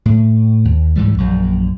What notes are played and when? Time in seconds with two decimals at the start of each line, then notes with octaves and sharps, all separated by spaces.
0.06 A2
0.65 D#2
0.96 C#2 G#2 E3 G3
1.18 A#1 F#2